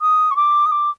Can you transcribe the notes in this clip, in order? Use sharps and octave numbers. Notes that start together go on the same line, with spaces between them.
D#6
C#6
D6
D#6
D6